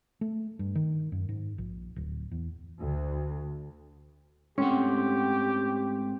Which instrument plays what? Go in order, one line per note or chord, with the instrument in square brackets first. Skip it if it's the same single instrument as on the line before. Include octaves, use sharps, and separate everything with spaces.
[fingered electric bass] A3
G2
D#3
F#2
G#2
A#1
D1
E2
[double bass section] D2
[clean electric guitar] G#2 A3 F#5 [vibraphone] C4 G5 [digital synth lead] C#4 [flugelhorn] G4